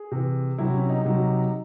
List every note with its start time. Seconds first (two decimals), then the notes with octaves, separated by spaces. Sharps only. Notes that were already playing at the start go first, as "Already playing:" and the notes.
Already playing: G#4
0.11 C3 E3
0.58 C3 F#3 E4
0.74 C#4
0.89 D#4
1.05 C3 F#3